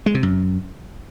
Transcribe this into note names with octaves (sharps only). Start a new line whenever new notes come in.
G#3
C3
F#2